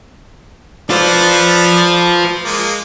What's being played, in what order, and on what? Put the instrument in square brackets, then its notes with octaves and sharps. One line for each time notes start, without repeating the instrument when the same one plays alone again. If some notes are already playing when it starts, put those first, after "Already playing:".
[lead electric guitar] F4 C5 [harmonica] A4 B4 D5
[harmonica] G#3 A#3